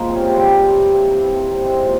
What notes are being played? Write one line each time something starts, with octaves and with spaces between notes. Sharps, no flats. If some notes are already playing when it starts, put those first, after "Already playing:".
Already playing: F3 G#3 A#3
C3
C#4
C3
G3 C4
C3
G3
E3
C3
C3
E3
C3
C3
G#3 C4
A#2